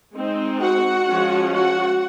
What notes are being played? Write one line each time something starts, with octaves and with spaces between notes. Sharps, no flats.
G#3 C4 D#4
F#4 F#5
F3 G#3 C#4
F#4 F#5